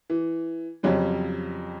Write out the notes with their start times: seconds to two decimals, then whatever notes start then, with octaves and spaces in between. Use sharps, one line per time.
0.10 E3
0.83 F2 C#3 F#3 G3 C4